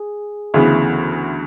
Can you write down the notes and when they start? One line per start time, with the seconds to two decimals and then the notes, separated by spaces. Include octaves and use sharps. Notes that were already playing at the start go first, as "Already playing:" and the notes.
Already playing: G#4
0.54 D2 C#3 E3 B3